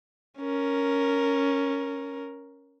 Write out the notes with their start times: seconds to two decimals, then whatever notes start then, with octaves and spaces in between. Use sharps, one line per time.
0.40 C#4 A#4